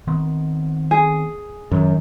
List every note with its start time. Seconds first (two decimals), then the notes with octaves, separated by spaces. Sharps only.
0.07 D#3 B3 C4
0.91 G#4
1.71 F#2 D#3